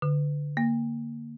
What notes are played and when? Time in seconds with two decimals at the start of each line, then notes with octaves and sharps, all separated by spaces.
0.02 D3
0.57 A#3